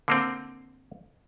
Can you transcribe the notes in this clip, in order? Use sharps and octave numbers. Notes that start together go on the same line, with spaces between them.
D3 A#3 C4